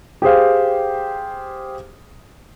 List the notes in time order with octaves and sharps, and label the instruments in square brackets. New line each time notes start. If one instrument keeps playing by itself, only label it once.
[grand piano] G4 G#4 C5 F5